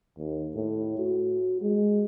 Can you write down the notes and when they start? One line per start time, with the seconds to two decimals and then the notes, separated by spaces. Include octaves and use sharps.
0.18 D#2
0.55 A2
0.98 F#4
1.61 G#3